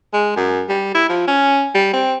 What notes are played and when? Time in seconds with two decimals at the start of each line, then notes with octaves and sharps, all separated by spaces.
0.13 G#3
0.36 F#2
0.69 G3
0.95 E4
1.09 F3
1.28 C#4
1.75 G3
1.93 C4